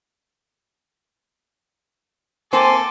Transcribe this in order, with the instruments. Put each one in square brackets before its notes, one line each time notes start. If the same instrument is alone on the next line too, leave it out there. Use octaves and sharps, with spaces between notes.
[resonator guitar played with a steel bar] A#3 C4 C5 [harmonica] A4 D6 [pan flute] G#5